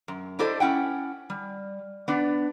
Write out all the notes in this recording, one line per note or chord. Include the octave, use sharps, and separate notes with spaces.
F#2
D4 E4 G4 A4 C5 D#5
C#4 E4 F#5 G5
G3
B3 D4